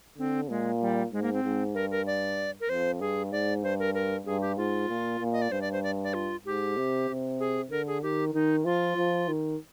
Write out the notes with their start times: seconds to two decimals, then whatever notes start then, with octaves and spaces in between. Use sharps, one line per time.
0.18 D3 C4
0.49 A#2 G#3
0.81 G3
1.12 G#2 G#3
1.22 A#3
1.34 C4
1.43 G#2
1.75 G2 A#4
1.91 A#4
2.07 D5
2.61 A#4
2.69 F2 C5
3.00 G2 G#4
3.32 G#2 D5
3.63 G2 C5
3.79 A#4
3.94 A#4
4.26 G2 G#4
4.41 G4
4.57 G#2 F4
4.89 A#2
5.20 A#2
5.33 D#5
5.42 D5
5.51 G2 C5
5.62 D5
5.72 C5
5.83 D5
6.04 D5
6.14 F4
6.46 G#2 G4
6.77 C3
7.09 C3
7.40 G#4
7.71 D3 A#4
7.87 G#4
8.03 D#3 G4
8.34 D#3 D#4
8.65 F3 F4
8.97 F3
9.28 D#3